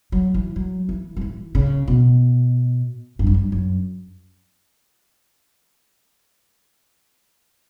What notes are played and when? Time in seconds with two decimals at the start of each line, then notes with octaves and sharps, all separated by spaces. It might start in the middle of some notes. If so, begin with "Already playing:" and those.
0.12 F#3
0.34 E3
0.56 F#3
0.89 E3
1.16 F#3
1.21 E3
1.55 C#3
1.88 B2
3.19 G2
3.27 F#2
3.34 G2
3.52 F#2